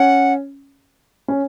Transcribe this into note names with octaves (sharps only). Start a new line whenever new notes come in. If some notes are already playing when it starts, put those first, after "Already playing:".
Already playing: C#4 F#5
C#4